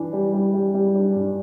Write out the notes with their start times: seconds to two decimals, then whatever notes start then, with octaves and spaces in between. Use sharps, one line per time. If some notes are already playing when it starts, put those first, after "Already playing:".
Already playing: E3 D4
0.13 G3
0.34 G3
0.54 G3
0.75 G3
0.95 D4
1.16 G2